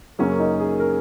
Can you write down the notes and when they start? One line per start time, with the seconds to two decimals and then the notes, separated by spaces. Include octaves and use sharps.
0.19 F#2 C#3 F#3 A#3 C#4
0.39 D#4
0.60 G#4
0.79 A#4